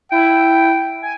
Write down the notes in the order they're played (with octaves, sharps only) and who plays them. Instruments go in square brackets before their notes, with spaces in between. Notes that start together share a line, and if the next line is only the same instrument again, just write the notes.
[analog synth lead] E4 [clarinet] G5
[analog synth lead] G#5